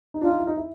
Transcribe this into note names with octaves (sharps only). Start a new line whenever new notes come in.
D#4
D4 F4
D#4
E4
D#4
E4